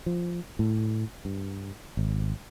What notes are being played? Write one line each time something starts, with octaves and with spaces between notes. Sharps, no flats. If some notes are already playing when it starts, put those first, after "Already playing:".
F3
A2
G2
G#1